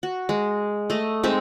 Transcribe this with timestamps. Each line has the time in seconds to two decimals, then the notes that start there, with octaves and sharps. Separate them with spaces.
0.03 F#4
0.29 G#3
0.90 A3 D#5
1.24 G#3 C4 D#4 E5